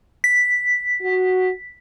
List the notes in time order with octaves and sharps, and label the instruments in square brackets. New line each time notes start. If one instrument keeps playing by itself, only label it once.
[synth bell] B6
[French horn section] F#4